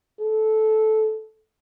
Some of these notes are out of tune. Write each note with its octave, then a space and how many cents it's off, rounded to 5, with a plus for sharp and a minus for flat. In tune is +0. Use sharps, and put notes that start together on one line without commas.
A4 -15